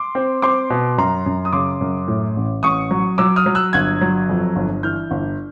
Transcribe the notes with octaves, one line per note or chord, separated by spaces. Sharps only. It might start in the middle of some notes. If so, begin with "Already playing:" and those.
Already playing: C6 D6
C4
C4 C6 D6
B2
F#2 A#5 C6
F#2
D#6
C#3 C6 D6
F#2
A2
A1
A1 C#6 D#6
F#3
F#3 D6 E6
D#6 F6
F#3
E6 F#6
G1 F#6 G#6
F#3
F2
G1
E3 F6 G6
G1